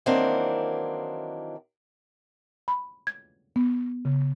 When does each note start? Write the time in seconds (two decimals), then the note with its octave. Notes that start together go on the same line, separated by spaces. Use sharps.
0.06 D#3 E3 F#3 A#3 C4 D4
2.68 B5
3.07 G#6
3.56 B3
4.05 C#3